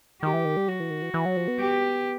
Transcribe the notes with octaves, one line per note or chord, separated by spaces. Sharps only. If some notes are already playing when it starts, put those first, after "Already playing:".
D#3 G4
E3
D#3
G3
F#3 F#4
E3
D#3
E3
E3
F#3
F3
B3
G4